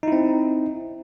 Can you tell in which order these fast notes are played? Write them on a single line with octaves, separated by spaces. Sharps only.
D#4 E4 C4